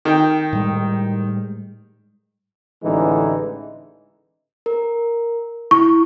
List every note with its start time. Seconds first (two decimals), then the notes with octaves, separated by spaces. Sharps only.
0.05 D#3 G5
0.53 A2 G3 G#3
2.83 A1 D3 E3 G#3 D#4
4.66 A#4
5.71 E4 C#6